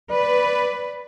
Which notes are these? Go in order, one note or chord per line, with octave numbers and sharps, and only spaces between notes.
B4 D5